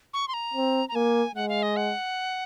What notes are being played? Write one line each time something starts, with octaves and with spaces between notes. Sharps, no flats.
C#6
C6
A#5
C4
A#5
A#3 G#5
G#3 F#5
F5
D#5
F#5